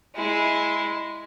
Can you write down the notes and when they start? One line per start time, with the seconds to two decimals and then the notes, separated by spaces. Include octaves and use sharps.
0.16 G#3 E4